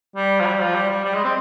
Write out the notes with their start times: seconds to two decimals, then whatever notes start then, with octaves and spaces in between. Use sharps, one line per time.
0.16 G3
0.40 F3
0.46 G3
0.60 F3
0.75 G3
0.90 G3
1.04 G3
1.15 G#3
1.24 C4